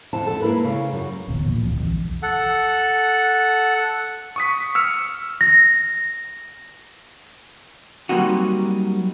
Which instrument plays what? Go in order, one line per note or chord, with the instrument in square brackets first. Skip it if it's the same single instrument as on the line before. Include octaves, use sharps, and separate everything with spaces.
[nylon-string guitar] F2 D3 E4 A5
A4
A#3 E4 A#4 B4
C#3
F#2
[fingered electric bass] D#1 A1 B2 D3
A#2 E3 F3
D1 A1 F2 C4
B1 E2 E3 F3
[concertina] A4 F#5
[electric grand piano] C#6 D#6 B6
E6 F6 C#7
[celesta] A#6
[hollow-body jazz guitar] F#3 G3 A#3 C4 D#4 F#4